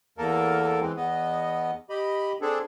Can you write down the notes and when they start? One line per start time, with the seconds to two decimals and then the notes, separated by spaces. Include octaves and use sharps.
0.18 E2 A#3 A4 A#4
0.81 E3 G#3 C4
0.96 E2 B3 D#5
1.90 G4 D#5 B5
2.41 C4 D4 G#4 A4